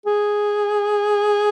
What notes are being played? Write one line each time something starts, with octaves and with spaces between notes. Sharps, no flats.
G#4